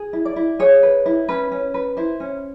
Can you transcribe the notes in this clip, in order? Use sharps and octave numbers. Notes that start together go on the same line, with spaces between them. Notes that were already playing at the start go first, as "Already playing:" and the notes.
Already playing: G#4
E4
D5
E4
G#4 C#5
B4
E4
C#4 B4
C#4
B4
E4 C5
C#4